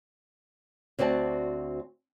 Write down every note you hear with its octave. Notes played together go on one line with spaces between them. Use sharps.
D2 C4 F#4 D5 A5